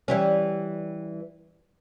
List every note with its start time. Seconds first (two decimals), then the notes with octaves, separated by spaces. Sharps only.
0.08 E3 G3 C#4